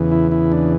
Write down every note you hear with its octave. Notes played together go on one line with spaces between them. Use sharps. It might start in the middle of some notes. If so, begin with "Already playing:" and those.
Already playing: E2 C#3 E3
E4
E4
D4